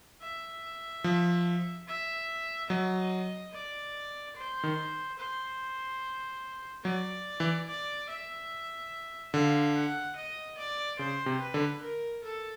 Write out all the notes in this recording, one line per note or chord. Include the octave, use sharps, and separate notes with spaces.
E5
F3
E5
F#3 D#5
D5
C5
D#3
C5
F#3 D5
E3
D5
E5
D3 F5
F#5
D#5
D5
C#3 C5
C3
B4
D3
A#4
A4